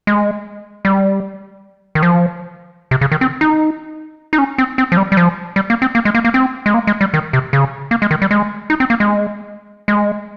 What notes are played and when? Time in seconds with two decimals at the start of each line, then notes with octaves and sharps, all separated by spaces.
0.07 G#3
0.85 G3
1.95 D#3
2.03 F3
2.91 C3
3.01 C#3
3.12 D#3
3.21 C4
3.41 D#4
4.33 D#4
4.38 C#4
4.58 C4
4.78 C4
4.92 F3
4.97 G3
5.12 G3
5.17 F3
5.56 G3
5.70 A#3
5.82 C4
5.95 A#3
6.05 G#3
6.15 A#3
6.25 A#3
6.34 C4
6.66 G#3
6.74 A#3
6.87 G#3
7.01 G3
7.14 D#3
7.33 C3
7.53 C#3
7.91 A#3
8.02 G#3
8.11 D#3
8.22 G3
8.31 G#3
8.70 D#4
8.80 C4
8.90 A#3
9.00 G#3
9.88 G#3